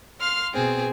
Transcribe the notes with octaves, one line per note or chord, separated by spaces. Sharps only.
F5 C6 F6
B2 C4 G#4